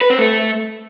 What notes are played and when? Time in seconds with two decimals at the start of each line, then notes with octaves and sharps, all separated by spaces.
0.01 B4
0.10 C4
0.19 A3